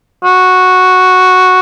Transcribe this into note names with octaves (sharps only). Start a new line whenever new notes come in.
F#4